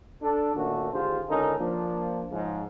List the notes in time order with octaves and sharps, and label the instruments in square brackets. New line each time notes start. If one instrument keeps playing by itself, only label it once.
[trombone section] D4 A4
A#2 D#3 A3 C#4 D4 F#4
G#1 D3 F4 G4 G#4 C5
C#2 D3 C#4 D#4 A4 A#4
F3 A#3 D4
G#2 C#3 F3